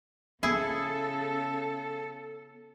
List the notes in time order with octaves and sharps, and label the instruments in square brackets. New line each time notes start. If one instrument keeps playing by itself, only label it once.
[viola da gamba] C#3 [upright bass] B3 [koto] E4 G#4 [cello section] A4